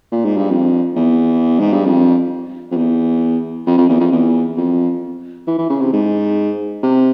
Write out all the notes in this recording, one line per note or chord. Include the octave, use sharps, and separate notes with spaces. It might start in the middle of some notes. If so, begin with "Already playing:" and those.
A#2
G#2
G2
F2
E2
G#2
G2
F2
F2
E2
F2
F2
E2
F2
E2
F2
E3
E3
C#3
C3
G#2
C3